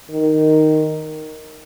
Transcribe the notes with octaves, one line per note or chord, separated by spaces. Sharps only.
D#3